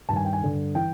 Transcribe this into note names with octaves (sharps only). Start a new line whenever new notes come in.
G2 D#3 A5
G#5
G5
G#5
G2 D3
E3 G5